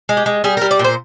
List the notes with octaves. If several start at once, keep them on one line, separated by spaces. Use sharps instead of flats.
G#3
G4
G#3
G3 G#4
A#4
G3
D5
A#2
C5